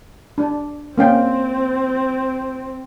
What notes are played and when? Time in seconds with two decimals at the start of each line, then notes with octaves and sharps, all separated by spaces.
0.38 D4
0.98 A#3 C4 C#4 G5